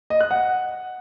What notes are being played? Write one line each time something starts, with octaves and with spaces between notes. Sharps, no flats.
D#5
F#6
F#5